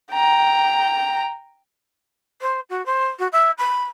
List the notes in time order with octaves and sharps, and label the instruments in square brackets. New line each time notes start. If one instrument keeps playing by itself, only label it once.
[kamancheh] G5 A#5
[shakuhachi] C5
F#4
C5
F#4
E5
B5